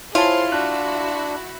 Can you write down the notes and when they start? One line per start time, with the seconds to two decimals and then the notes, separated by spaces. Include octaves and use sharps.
0.15 E4 F4 G#4 C5 C#5 A5 C6
0.52 D4 E4 F#4 E5 F#6